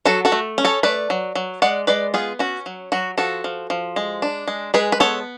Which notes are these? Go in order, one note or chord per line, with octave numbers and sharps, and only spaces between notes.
F#3 F#4 A4
F#4 A4
A3
C#4
A4 C#5
A3 B4 D5
F#3
F#3
G#3 D5 F#5
G#3 B4 D5
B3 F4 G#4
C#4 F#4
F#3
F#3 F#4
F3 F#4 A4
F3
F3
G#3
D4
G#3
G#3 G#4 B4
B4
B3 A4 C#5